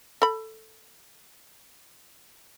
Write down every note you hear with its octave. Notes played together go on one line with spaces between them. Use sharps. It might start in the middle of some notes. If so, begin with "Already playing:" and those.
A4 B5